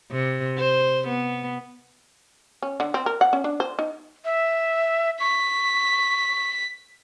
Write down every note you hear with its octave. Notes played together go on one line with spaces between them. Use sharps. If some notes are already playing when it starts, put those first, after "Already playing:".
C3
C5
B3
C#4
D3
C4
A#4
F#5
C#4
D4
C5
D#4
E5
C#6 B6